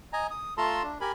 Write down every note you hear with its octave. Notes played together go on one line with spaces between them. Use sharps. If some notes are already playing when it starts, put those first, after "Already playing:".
D#5 G#5 A#5
D#6
A3 F4 A4 A5 A#5 C6
D4
G4 A#4 G#5 B5